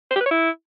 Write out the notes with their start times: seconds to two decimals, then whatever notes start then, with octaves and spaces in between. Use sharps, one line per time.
0.11 C5
0.16 G4
0.21 B4
0.26 C#5
0.31 E4